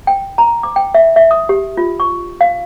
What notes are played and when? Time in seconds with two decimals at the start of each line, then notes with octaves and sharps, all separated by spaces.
0.07 G5
0.38 A#5
0.63 D6
0.76 G5
0.94 E5
1.16 E5
1.31 D#6
1.49 G4
1.77 F4
2.00 C#6
2.41 F5